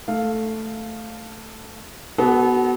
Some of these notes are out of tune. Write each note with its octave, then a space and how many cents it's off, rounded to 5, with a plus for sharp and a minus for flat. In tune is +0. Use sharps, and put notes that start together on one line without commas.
A3 +5 F5 +0
B3 +0 F#4 +25 A4 -35